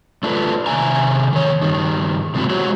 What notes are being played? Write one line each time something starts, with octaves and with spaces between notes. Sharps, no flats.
A3 D4 F4 A4 B4
C3 D#3 B3 E5 G#5 A#5
D#3 C#5
G2 D#3
C3 G#3 B3 C4 E4 F#4
F#3 G#3 F#4 C5 C#5 F#5